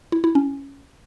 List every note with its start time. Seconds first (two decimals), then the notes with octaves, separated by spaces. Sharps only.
0.12 E4
0.24 E4
0.35 C#4